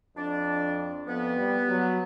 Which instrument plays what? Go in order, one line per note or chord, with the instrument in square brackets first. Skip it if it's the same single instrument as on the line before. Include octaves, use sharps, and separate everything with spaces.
[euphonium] F2 [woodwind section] D4 D5
[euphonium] F2 [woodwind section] B3
[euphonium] G3
F#3